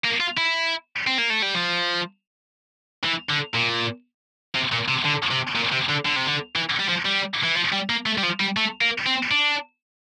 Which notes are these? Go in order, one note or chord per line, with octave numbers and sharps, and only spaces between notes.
A#3
F4
E4
C4
A#3
A3
G3
F3
E3
D3
A#2
C3
A#2
C3
D3
C3
A#2
C3
D3
D3
C3
D3
E3
G3
F3
G3
E3
F3
G3
A#3
A3
G3
F3
G3
A3
A#3
C4
D4